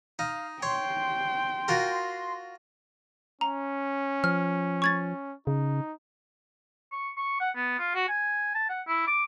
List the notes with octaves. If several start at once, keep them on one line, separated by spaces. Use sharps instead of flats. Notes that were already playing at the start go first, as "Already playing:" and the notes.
D#4 F5
C#5 G5 C6
F4 F#4 A#4
C#4 A#5
F3 F6
C#6 G#6 A6
C#3 D#4
C#6
C#6
F#5
B3
F4
F#4
G#5
A5
F#5
E4
D6